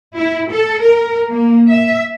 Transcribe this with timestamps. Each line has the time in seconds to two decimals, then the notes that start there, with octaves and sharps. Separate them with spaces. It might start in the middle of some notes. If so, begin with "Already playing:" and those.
0.16 E4
0.50 A4
0.81 A#4
1.29 A#3
1.69 E5